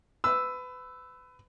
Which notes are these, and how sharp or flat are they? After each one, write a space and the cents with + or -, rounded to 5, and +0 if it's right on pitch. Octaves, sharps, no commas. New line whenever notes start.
B4 +25 E6 +0